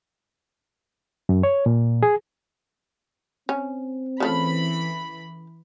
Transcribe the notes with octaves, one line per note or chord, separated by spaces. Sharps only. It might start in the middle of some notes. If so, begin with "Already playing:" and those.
F#2
C#5
A#2
G#4
C4 C#4
C#3 E3 A3 F4 B5